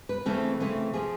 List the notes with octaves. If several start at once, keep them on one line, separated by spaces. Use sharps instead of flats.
B4
C#3 E3 A3 C4 A4
C#3 E3 A3 C4
C#3 F3 G#4